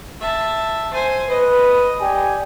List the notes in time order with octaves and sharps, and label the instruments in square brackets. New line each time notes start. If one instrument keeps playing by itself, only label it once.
[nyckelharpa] E5 A5
C5 G#5
[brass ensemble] B4 [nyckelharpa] D#5
[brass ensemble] G4 D5 G#5